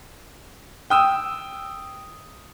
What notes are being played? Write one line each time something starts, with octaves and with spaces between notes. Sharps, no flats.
G5 D#6 E6